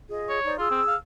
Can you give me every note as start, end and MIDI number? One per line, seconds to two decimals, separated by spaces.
0.09 0.39 65
0.09 0.39 68
0.09 0.39 75
0.29 0.53 73
0.45 0.57 63
0.45 0.57 72
0.45 0.57 74
0.58 0.68 65
0.58 0.93 68
0.58 0.93 88
0.71 0.82 60
0.88 0.97 77